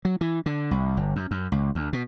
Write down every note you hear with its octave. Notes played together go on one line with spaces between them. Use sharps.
F#3
E3
D3
C2
G1
F#2
F#2
C#2
D2
B2